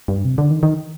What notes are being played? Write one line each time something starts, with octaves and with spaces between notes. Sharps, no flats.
G2
C3
D3
D#3
D#3